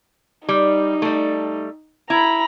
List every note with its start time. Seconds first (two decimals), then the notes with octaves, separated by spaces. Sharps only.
0.49 G3 D#4
1.02 G3 A3
2.10 E4 A#5 B5